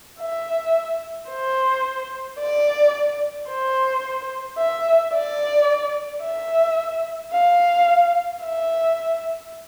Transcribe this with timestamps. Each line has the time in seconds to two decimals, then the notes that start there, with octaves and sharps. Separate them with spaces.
0.20 E5
1.30 C5
2.39 D5
3.49 C5
4.59 E5
5.14 D5
6.23 E5
7.33 F5
8.43 E5